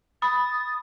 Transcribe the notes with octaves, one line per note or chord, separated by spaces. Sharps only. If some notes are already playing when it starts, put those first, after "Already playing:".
B5 D#6 A6